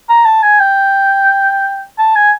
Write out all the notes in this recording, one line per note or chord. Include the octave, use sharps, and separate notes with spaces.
A#5
A5
G#5
G5
A5
G#5